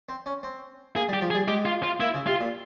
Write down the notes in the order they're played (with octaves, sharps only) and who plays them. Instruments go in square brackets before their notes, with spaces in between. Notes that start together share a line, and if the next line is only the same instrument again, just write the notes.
[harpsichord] C4
C#4
C4
[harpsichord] A#3 [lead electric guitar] G#4
[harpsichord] G3
[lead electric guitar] G4
[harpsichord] F3
[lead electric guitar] G#4
[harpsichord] G3
[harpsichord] G#3 [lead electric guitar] G4
[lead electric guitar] F4
F4
[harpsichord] A#3 [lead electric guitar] E4
[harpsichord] C#3
[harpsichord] C3 [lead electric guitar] F4
[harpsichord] A#2